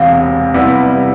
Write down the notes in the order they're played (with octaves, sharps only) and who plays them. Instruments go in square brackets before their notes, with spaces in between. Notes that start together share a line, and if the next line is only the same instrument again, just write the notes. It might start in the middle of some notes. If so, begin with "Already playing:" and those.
Already playing: [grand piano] E1 E2 C3 [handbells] F5
[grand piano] C3 G3 B3 E4